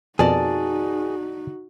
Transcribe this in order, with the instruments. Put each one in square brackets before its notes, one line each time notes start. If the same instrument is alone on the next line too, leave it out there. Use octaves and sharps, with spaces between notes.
[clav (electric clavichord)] F2 B2 [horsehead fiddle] D#4 F#4 [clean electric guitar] G#4 [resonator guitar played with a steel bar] A#4 D5 A5